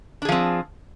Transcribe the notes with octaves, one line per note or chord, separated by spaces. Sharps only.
F3 C4 D4 G#4